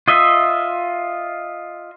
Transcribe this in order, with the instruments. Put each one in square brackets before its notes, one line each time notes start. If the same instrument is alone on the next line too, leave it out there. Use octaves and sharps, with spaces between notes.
[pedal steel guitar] F4 D#5 E5